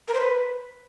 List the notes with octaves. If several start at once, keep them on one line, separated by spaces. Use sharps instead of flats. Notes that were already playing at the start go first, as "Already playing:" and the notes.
A#4
C5
B4